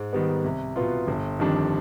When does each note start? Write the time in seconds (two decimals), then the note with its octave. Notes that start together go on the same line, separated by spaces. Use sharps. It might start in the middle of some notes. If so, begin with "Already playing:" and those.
Already playing: G#2
0.13 D#3 G3 B3
0.44 C2
0.76 B2 B3 F4
1.08 G1
1.39 F2 D#3 G3 D4